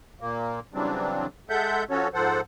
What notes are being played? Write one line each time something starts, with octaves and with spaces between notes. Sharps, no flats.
A#2 A#3
C#3 E3 F#3 G3 C4 D4
G#3 A4 E5 F#5 G6
F3 C#4 F#4 A4 C#5
G#2 F3 A4 C5 F#5